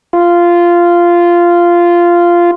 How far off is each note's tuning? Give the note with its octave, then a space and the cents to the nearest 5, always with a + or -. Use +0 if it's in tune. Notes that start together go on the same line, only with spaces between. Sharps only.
F4 -10